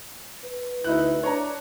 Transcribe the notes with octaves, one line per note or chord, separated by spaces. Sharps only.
B4
D2 D#4 E4 F#6
D4 C#5 A#5